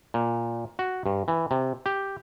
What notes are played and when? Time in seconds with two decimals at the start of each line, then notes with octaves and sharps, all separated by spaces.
0.14 A#2
0.79 F#4
1.06 G2
1.28 E3
1.51 C3
1.86 G4